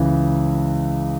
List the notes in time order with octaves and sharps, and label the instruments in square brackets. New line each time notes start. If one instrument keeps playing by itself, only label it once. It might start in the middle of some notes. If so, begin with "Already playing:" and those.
Already playing: [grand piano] C#2 C#3 E3